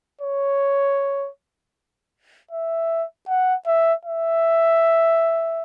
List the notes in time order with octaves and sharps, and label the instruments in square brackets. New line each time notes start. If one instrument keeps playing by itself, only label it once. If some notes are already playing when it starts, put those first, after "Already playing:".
[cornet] C#5
E5
F#5
E5
E5